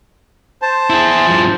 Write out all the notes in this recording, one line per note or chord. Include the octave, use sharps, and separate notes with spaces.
C5 A5
E4 G#4
G2 F3